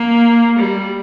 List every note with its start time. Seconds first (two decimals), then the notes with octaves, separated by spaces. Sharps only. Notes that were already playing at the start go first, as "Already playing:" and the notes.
Already playing: A#3
0.58 G3